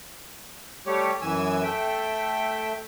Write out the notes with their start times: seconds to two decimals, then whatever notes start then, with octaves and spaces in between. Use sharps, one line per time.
0.87 G3 A3 G4 C#5
1.22 F#2 E3 G#5 E6
1.63 A3 E5 G5